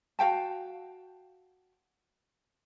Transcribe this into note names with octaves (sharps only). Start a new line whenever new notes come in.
F#4 F5 G5 A5